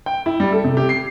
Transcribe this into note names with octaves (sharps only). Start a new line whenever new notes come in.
G5
E4
G3
A4
C3
G4
C7